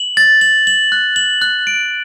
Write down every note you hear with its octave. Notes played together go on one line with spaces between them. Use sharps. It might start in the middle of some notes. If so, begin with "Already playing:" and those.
Already playing: F#7
A6
F#7
F#7
F#6
F#7
F#6
D7